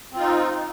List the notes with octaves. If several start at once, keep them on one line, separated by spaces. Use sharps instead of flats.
C4 D#4 F4